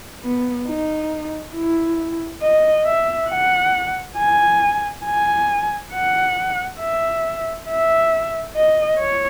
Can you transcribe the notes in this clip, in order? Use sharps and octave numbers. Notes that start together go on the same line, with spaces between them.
B3
D#4
E4
D#5
E5
F#5
G#5
G#5
F#5
E5
E5
D#5
C#5